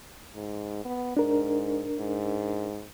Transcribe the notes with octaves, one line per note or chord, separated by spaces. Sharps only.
G#2
B3
G#2 D4 A#4
G#2